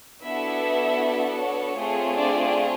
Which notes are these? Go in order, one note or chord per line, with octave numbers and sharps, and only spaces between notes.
B3 D4 E4 F#4 A4 E5
C#5
A3 C4 F4 G#4
D4 D5